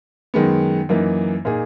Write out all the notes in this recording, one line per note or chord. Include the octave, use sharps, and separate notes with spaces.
F#2 D#3 G#3 B3
F#2 E3 A#3 D#4
A#2 A#3 D#4 G#4